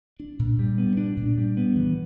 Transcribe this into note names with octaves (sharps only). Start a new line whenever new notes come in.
D4
A#2
G3
B3
D4
A#2
G3
B3
E3